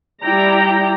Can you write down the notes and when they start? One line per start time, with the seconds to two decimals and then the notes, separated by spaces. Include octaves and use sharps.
0.24 G3 E4 D5 G5 A#5